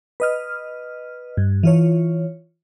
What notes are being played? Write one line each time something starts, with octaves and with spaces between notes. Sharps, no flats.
B4 D#5 F6
G2
E3 F4 C#5